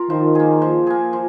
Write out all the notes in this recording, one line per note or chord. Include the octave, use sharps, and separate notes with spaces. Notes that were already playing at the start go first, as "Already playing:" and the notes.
Already playing: F4 A#4
D#3 F3
A#3 G#4
F3
A#3 G#4
F3